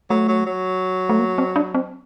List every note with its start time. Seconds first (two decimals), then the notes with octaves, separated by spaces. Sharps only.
0.10 F#3 A3
0.28 F#3
0.46 F#3
1.09 A3
1.19 A#3
1.38 C4
1.56 D4
1.74 C4